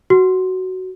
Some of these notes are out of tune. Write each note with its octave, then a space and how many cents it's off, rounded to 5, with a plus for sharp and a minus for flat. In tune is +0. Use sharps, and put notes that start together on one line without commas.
F#4 +10